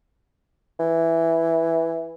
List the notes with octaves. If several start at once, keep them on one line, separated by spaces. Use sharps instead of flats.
E3